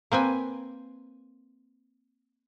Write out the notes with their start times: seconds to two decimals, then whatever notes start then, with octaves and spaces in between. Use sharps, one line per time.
0.12 A#3 C4 B4 G#5